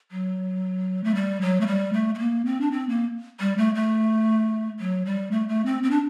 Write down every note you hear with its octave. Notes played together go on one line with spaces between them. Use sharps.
F#3
A3
G3
F#3
A3
G3
A3
A3
A#3
C4
D4
C4
A#3
G3
A3
A3
F#3
G3
A3
A3
C4
C4
D4